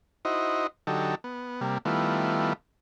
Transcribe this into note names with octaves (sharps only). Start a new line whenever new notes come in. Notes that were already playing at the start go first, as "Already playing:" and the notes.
D#4 E4 F#4 C5 D#5
D3 F#3 D#4 G4 A4
B3
C3 G3 A#3
D#3 G3 A3 B3 E4 F4